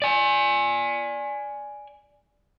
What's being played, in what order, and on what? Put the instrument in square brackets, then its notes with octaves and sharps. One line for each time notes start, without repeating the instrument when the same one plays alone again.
[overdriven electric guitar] D5 G#5